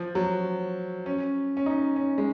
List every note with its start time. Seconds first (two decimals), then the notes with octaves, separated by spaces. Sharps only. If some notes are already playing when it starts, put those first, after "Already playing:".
Already playing: F3
0.15 F#3
1.06 C#4
1.57 C#4
1.66 D#4
1.96 C#4
2.18 G#3